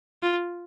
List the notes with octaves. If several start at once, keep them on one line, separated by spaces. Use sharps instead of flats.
F4